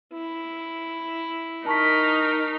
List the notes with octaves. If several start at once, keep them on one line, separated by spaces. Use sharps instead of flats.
E4
D#4 A#4 A5 C#6 B6